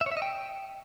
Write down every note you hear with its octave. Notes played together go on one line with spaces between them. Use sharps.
E5
C#5
E5
D#5
G5